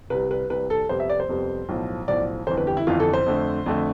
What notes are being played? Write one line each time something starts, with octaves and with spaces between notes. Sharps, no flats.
C2 C3 G3 B4
B4
C2 C3 G3 B4
A4
F2 C3 G3 B3 C5
E5
D5
C5
F2 C3 G3 B3
B1 A2 F3
B1 A2 F3 D5
G1 F2 E3 C5
B4
G4
E4
G1 F2 E3 F4
A4
C5
F2 D3 A3
F2 D3 A3